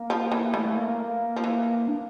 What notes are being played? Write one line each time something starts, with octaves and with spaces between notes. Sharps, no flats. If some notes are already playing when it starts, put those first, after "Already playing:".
Already playing: A#3
F3
E3
E3 A3
A3
A#3
A#3
F3
E3
D4